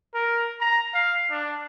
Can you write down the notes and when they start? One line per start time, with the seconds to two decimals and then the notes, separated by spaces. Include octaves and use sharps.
0.14 A#4
0.61 A#5
0.94 F5
1.31 D4